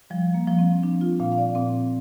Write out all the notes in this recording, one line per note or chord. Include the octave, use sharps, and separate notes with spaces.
F3 G3
A#3
F3
C4
F3 D4
F4
A#2 F5
F5
D5
A#2 C4